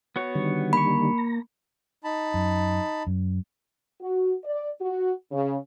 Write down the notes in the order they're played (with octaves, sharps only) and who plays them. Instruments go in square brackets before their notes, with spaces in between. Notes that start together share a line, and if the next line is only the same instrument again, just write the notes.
[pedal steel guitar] B3 F#4 C#5
[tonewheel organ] D3 D#3 G3
[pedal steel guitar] A#3 C#6 [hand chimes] B5
[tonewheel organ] A#5
[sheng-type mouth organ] D#4 A5 B5
[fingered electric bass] F#2
F#2
[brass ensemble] F#4
D5
F#4
C#3